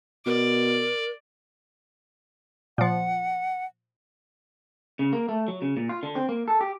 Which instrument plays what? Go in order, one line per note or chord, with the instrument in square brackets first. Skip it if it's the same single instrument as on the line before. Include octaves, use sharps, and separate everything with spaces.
[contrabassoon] B2 [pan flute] A#4 [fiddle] D5
[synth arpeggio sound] A#2 F3 [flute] F#5
[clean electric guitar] C#3
A#3
A3
F#3
C#3
A#2
F4
D3
C4
A#3
A4
G4